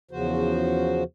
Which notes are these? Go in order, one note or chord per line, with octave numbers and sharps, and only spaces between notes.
E2 C#3 F3 F#4 C5